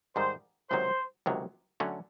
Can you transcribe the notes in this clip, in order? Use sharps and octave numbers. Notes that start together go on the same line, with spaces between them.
G#2 D#3 G3 C5
C#2 C3 D#3 F#3 C5
C#2 C3 D#3 F#3
D3 F#3 A3 C#4